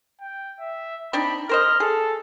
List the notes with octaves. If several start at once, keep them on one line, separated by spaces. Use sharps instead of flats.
G5
E5
C4 D4 D#4 B5
A#4 C5 D#5 F6
G#4 A4